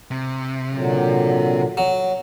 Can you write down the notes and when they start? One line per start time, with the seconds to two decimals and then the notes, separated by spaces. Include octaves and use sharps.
0.11 C3
0.72 A#2 D3 F#3
1.77 F#3